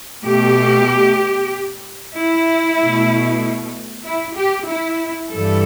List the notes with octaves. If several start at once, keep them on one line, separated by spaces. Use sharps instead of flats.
B2 A3 G4
E4
B2 A3
E4
G4
E4
G2 E3 G3 A4